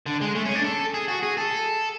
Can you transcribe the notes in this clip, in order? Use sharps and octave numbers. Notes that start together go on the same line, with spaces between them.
D3
G#3
A3
C#4
D4
A4
G#4
F#4
G#4
A4